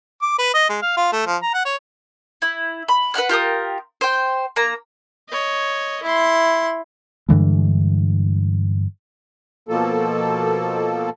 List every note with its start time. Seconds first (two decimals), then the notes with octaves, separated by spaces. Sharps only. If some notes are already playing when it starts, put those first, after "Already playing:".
0.22 D6
0.38 B4
0.54 D#5
0.69 G#3
0.82 F5
0.97 F4
1.12 A3
1.27 F3
1.42 A#5
1.54 F#5
1.65 C#5
2.42 E4
2.88 B5
3.14 B4 E5 F#5 F6
3.29 F4 G4 A#4 D#6
4.01 C5 G5
4.56 A#3 A#5
5.30 C#5 D#5
6.03 E4 C6
7.29 G2 D3 E3 G#3
9.69 B2 F3 A#3 A4